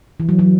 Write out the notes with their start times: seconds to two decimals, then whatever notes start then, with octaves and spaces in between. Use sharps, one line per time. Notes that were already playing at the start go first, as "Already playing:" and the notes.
0.20 E3
0.29 F#3
0.39 F#3